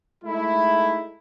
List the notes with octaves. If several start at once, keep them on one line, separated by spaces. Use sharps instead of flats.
G#3 A3 D#4 E4